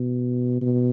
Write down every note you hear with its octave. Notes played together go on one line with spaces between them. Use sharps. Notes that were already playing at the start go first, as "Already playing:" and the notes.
Already playing: B2
B2